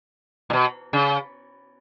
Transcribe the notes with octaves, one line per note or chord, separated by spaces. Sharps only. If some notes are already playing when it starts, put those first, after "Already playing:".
A#2
B2
C#3